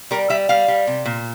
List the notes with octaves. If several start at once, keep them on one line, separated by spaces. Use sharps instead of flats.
G3 A#4
G3 E5
G3 F5
G3
C3
A#2